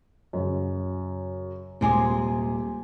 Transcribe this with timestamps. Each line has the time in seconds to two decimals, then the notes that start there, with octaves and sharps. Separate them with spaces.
0.33 F#2 C#3
1.81 D#1 C3 G#3 G#4 G#5 D6